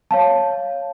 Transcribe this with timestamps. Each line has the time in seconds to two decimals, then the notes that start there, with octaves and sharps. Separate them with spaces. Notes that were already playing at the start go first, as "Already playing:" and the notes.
0.11 C#5 F5 A5